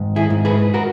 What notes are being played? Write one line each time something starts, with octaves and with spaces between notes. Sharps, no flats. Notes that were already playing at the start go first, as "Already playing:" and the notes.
Already playing: G#2 D#3
E4 G#4
G#2
G#4 B4
F#4 A#4